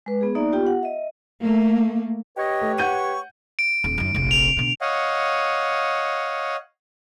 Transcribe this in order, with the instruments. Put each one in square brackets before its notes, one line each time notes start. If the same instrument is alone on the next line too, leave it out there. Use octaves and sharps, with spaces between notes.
[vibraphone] G#3 B4
B3 G#4
A#3 D#4 D5 E5
B3 F4 G4 G5
F#5
D#5 E5
[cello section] A3 A#3
[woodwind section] G4 B4 C#5 [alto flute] D#5
[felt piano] A3
[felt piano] F#5 G6 D#7 [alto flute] C#6
[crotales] D7
[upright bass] D#1
F#2 D#3
F1 A#1
[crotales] F7
[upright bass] B2 D3
[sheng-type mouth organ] C#5 D#5 F5 F#5